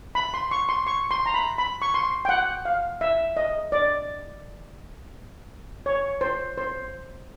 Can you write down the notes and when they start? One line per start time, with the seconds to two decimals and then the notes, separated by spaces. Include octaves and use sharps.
0.15 B5
0.34 C6
0.51 C#6
0.69 C6
0.87 C#6
1.11 C6
1.26 A#5
1.34 B5
1.58 B5
1.82 C#6
1.94 C6
2.25 G5
2.29 F#5
2.65 F5
3.01 E5
3.37 D#5
3.72 D5
5.86 C#5
6.21 C5
6.58 C5